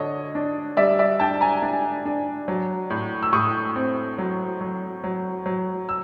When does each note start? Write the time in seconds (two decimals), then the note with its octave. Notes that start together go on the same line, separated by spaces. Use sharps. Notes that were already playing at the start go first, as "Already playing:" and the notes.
Already playing: D3 C#5 D#5
0.35 D4
0.77 G3 D5 E5
0.99 D5 E5
1.20 D4 G5 A5
1.41 G#5 A#5
1.62 D4
2.05 D4
2.48 F#3
2.90 A2
3.23 E6
3.33 A2 C#6 D#6
3.76 C4
4.18 F#3
4.61 F#3
5.04 F#3
5.46 F#3
5.89 E6